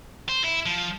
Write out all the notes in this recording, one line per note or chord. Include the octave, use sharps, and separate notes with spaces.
C5
E4
F3